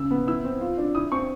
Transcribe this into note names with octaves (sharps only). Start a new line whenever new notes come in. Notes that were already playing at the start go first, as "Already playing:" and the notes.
Already playing: C#3 E6
B3
E4 E6
C4
F4
D4
E4 D#6
C4 C#6